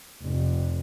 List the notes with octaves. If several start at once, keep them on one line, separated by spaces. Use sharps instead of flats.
F1